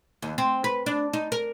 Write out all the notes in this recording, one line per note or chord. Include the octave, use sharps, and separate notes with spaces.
D#2
C4
B4
D4
D#4
A#4